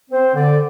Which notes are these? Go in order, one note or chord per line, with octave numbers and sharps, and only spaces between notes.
C4 C5
D3 D5